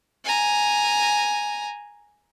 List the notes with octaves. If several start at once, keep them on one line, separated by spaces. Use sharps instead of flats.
G#5 A#5